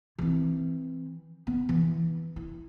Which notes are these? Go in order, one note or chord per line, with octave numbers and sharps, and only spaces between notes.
E3 C4
B3
E3
E4